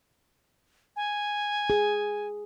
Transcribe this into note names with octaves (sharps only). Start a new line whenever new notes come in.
G#5
G#4